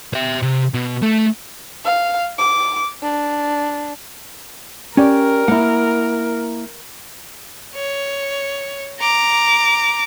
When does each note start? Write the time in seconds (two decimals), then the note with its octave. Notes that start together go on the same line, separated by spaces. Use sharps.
0.13 C5 E5
0.43 C3
0.74 B2
1.03 A3
1.84 F5
2.38 D6
3.02 D4
4.97 C#4 G4 A#4 D5
5.48 A#3 E4 F#5
7.75 C#5
9.00 A#5 D6